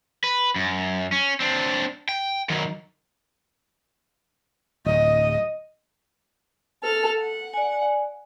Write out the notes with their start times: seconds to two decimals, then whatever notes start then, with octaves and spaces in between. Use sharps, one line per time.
0.24 B4
0.56 F#2
1.12 C#4
1.40 C4 D4
2.09 G5
2.49 D#3 F#3
4.86 D1 D#5
6.82 A4 F6
7.20 F#5
7.54 D5 G#5